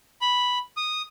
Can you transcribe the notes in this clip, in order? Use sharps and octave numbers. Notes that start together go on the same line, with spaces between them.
B5
D#6